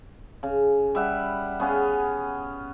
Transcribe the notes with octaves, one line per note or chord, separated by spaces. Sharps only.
C#3
G3 E5 F#5
B3 C#4 G#4 F5